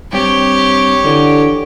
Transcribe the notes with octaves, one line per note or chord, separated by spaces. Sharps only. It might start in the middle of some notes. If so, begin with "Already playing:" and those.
G2 C4 G4 C#5
D3 E3